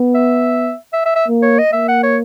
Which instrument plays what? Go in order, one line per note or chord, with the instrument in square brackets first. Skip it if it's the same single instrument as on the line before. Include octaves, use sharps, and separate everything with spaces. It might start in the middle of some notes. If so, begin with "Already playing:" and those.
Already playing: [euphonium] B3
[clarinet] E5
E5
E5
E5
[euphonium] A#3
[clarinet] C#5
D#5
[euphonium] A#3 [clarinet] E5
[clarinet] F#5
C#5